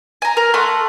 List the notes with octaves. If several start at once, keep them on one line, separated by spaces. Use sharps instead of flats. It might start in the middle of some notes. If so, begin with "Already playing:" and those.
G#5 A#5
A#4
A3 F#5 C6